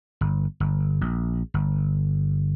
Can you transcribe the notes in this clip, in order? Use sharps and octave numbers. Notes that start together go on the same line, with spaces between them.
G1
G1
A#1
G1